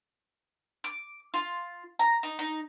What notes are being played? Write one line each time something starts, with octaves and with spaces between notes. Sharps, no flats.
D6
F4
A#5
D#4
D#4